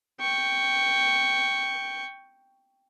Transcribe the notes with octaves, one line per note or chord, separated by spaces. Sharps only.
G5 C#6